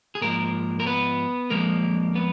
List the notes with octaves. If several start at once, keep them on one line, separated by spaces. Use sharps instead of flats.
G#4
G#2 F3 G#3 A#3 A#4
A#4
B3 B4
F2 F3 G#3 A#3 A#4
B3 B4